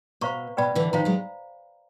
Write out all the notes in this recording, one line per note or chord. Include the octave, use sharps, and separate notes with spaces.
B2 C5 F5 A#5 C#6
B2 B4 D5 G5 B5
D3 E3
D#3 F3 C5 F5 A#5
F#3 G#3